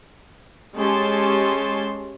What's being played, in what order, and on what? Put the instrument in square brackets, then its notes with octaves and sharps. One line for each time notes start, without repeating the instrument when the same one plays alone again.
[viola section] G#3 C#4 G4 A5 C6